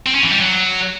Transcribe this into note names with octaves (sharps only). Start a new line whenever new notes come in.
C4
C#4
E3
G3
F#3